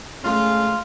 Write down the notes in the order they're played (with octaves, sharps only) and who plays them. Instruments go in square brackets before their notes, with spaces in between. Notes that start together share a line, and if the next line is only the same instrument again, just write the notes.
[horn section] G#3 F4 [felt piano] A3 C#4